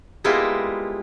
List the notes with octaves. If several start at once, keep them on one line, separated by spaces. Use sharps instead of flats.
G3 G#3 A#3 B3 E4 F4